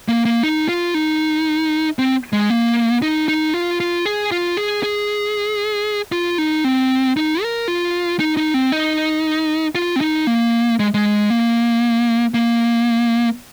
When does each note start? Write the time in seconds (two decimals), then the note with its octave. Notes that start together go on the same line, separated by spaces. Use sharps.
0.08 A#3
0.25 A#3
0.43 D#4
0.69 F4
0.94 D#4
1.99 C4
2.33 G#3
2.50 A#3
3.02 D#4
3.28 D#4
3.54 F4
3.80 F4
4.05 G#4
4.32 F4
4.57 G#4
4.83 G#4
6.12 F4
6.38 D#4
6.64 C4
7.17 D#4
7.43 A#4
7.68 F4
8.19 D#4
8.37 D#4
8.54 C4
8.72 D#4
9.75 F4
9.96 C4
10.01 D#4
10.27 A#3
10.79 G#3
10.94 G#3
11.30 A#3
12.34 A#3